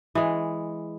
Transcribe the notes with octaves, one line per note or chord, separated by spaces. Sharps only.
E3 G#3